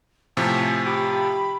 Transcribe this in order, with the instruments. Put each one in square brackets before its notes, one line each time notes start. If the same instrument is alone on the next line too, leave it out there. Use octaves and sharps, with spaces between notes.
[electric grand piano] A2 C3 F3 [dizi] G#5
[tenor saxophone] G4 [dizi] B5